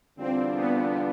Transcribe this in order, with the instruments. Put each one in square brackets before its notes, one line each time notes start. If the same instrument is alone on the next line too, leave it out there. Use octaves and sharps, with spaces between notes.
[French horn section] E2 D3 G3 D4 F4 [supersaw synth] C4
[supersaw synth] B3